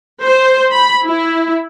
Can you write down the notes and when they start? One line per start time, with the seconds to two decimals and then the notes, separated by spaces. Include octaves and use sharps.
0.21 C5
0.71 B5
1.05 E4